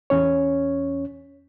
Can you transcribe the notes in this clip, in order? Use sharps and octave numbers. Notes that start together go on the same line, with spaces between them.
E2 C#4 C#5